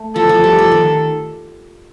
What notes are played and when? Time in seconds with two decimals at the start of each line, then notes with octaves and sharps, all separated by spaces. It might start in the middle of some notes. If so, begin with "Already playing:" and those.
Already playing: A3
0.16 F3 A4
0.29 F3
0.44 G3
0.59 F3
0.72 D#3